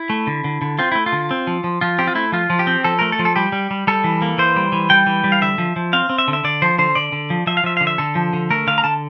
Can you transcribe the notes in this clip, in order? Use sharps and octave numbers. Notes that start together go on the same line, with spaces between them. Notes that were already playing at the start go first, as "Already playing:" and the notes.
Already playing: E4
A3
D3
D3
D3
C4 F4
A3 E4
F4
D3
C4
F3
F3
F3 F4
C4 G4
F4
A3 E4
F3 F4
F3
G4
C4
F3 A4
A3 A#4
A4
F3
A4
G3 G4
G3
G3
G3 A4
E3
A#3
E3 C5
G3
E3
G3 G5
E3
G3
F5
D3 E5
F3
F3
C4 F5
C4
E5
D3
E5
D3 D5
F3 C5
D3 C5
D3 D5
D3
F3
F3 E5
F5
F3 E5
D3 F5
E5
D3 A4
F3
D3
A3 A#4
D3 F5
A#5
D3 A5